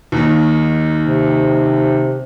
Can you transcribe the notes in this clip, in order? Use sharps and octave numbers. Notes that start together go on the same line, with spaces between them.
D#2 D#3
C3